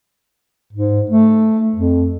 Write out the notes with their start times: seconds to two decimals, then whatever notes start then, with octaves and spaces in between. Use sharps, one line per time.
0.73 G#2
1.10 A3
1.76 F2